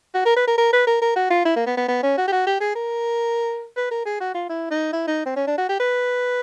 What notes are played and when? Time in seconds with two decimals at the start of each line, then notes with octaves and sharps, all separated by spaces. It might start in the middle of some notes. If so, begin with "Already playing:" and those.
0.14 F#4
0.25 A#4
0.36 B4
0.47 A#4
0.58 A#4
0.73 B4
0.87 A#4
1.02 A#4
1.16 F#4
1.30 F4
1.45 E4
1.56 A#3
1.66 B3
1.77 B3
1.88 B3
2.03 C#4
2.18 F#4
2.28 G4
2.32 F#4
2.47 G4
2.61 G#4
2.75 A#4
3.77 B4
3.91 A#4
4.06 G#4
4.20 F#4
4.34 F4
4.49 E4
4.71 D#4
4.93 E4
5.07 D#4
5.26 C4
5.36 C#4
5.47 D4
5.58 F#4
5.69 G4
5.80 B4